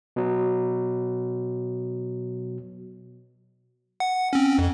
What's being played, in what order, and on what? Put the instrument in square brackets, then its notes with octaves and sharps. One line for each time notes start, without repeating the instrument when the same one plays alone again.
[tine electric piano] B2 F#3
[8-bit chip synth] F#5
C4 C#4
F2